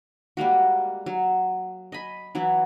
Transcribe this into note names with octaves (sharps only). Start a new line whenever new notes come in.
G3 G#3 A#3 F#4
F#3
D#5 G#5 B5
E3 F#3 E4